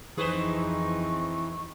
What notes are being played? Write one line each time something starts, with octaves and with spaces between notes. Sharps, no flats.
F2 E3 C4 D#4 G#4 B4 C5 C#6